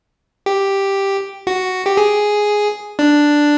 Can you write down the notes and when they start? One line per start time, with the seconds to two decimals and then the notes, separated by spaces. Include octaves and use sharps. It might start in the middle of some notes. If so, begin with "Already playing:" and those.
0.46 G4
1.47 F#4
1.86 G4
1.97 G#4
2.99 D4